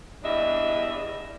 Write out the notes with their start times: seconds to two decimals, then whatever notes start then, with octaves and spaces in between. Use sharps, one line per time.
0.24 E2 G2 D4 D#5 E5